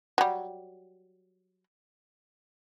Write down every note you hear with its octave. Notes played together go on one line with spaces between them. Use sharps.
F#3 G3